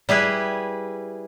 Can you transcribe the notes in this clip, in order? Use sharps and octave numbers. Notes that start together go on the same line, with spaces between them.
G3 E4 G#4 B4